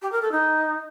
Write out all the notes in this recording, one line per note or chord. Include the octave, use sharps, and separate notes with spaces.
G4
A#4
A4
D#4